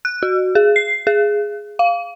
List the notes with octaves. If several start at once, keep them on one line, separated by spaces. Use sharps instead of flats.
F#6
F#4
G#4
C7
G#4
F5